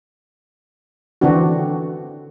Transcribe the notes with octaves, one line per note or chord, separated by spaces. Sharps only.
D3 E3 C4 D4 F#4